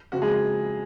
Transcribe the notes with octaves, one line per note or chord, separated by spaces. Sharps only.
F#1 F2 C#3 F#4
G#3 G#4